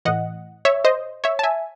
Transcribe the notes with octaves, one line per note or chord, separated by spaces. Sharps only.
A2 E3 D#5 F#5
C#5 E5
C5 D#5
C#5 E5
A5
E5 G#5